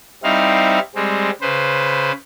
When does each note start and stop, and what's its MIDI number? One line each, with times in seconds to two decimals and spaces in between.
0.23 0.79 55
0.23 0.79 60
0.23 0.79 63
0.23 0.79 64
0.23 0.79 77
0.95 1.30 55
0.95 1.30 56
0.95 1.30 60
1.41 2.12 49
1.41 2.12 71
1.41 2.12 72